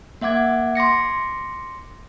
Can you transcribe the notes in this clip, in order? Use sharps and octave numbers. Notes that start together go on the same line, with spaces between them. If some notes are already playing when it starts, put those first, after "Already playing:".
A#3 E5 F#5 D6 G#6
C6 D6 A#6 C#7